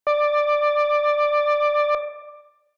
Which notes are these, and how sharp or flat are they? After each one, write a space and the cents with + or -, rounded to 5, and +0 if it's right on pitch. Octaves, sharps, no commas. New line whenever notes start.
D5 +10